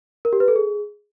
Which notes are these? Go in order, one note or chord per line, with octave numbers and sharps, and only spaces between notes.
A#4
G4
B4
A4
G#4